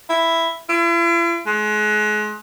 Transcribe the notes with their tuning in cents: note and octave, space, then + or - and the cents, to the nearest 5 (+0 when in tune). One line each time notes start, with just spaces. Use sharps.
E4 +0
E4 +45
G#3 +30